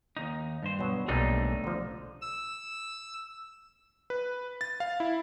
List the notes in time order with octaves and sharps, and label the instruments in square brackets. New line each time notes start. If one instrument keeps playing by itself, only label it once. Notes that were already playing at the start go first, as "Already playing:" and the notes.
[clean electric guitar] D#2 D#4
G2 C5
[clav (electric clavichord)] B2 F#3
[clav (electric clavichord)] B1 A#2 G3 [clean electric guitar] A3 D4 D#4
[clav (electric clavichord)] D3 F3
[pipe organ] E6
[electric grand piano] B4
A6
F5
E4